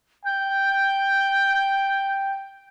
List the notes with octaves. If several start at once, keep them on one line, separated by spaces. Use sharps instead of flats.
G5 G6